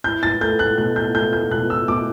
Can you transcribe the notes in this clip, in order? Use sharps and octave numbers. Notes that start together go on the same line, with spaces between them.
E4 G6
A6
A3 G6
F#6
B2 F#6
G6
A3 G6
G6
B2 F#6
E6
B2 D6